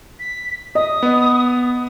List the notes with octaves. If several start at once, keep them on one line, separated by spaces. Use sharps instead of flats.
B6
D#5 D#6
B3